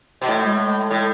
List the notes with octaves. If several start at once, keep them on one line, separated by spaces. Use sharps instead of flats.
B2
A2 A3
G#3
A2